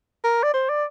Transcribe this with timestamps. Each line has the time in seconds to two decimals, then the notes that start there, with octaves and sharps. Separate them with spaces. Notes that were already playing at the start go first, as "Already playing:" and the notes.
0.24 A#4
0.43 D5
0.54 C5
0.69 D5